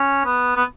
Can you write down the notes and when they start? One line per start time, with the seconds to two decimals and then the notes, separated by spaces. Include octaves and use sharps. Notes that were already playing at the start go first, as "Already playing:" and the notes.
Already playing: C#4
0.25 B3
0.56 B3